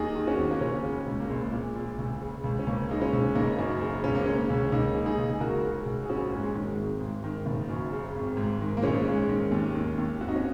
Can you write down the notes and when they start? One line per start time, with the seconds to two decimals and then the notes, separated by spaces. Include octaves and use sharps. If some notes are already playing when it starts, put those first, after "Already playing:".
Already playing: D#2 D#4 G#4
0.15 D#3
0.27 C#4 F#4
0.38 D#2
0.51 A#3
0.61 C#2 G#3 C#4
0.83 C#3
1.06 C#2
1.20 A#3
1.30 A#1 G#3
1.53 A#2
1.75 A#1
1.98 C#2
2.21 C#3
2.44 C#2
2.59 C#4
2.67 C#2 A#3
2.89 C#3 D#4
3.01 G#3 C#4
3.13 C#2
3.35 F#1 A#3 D#4
3.59 F#2
3.81 C#3
4.04 C#2 C#4
4.15 A#3
4.26 C#3 G#3 C#4
4.50 C#2
4.72 C#2 A#3 D#4
4.95 C#3
5.06 D#4 G#4
5.18 C#2
5.40 C#2 F#4 A#4
5.64 C#3
5.86 C#2
6.05 G#4
6.09 A#1 C#4 F#4
6.31 G#2
6.43 G#3
6.54 D#3
6.78 G#1
7.01 G#2
7.24 D#3
7.46 F#1
7.69 F#2
7.92 C#3
8.15 G#1
8.37 G#2
8.61 D#3
8.77 A#3
8.83 A#1 G#3 C#4
9.06 G#2
9.29 D#3
9.51 D#2
9.75 D#3
9.98 D#2
10.21 G#1 F#4
10.28 D#4
10.36 C#4 F#4